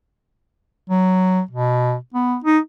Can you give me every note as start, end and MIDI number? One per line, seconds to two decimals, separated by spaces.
0.90 1.41 54
1.51 1.96 47
2.14 2.36 59
2.45 2.59 63